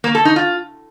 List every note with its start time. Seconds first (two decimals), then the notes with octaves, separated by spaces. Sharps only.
0.04 A#3
0.15 A4
0.25 D#4
0.36 F4